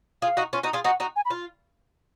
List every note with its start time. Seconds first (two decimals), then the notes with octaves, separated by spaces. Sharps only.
0.22 F4 G#4 F5
0.37 D#4 F#4
0.53 C#4 F4
0.63 D#4 F#4
0.73 F4 G#4
0.84 D#4 F#4 F#5
1.00 D#4 F#4
1.16 G#5
1.25 B5
1.30 F4